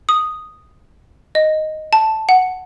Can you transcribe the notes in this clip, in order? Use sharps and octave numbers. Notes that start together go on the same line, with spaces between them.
D#6
D#5
A5
F#5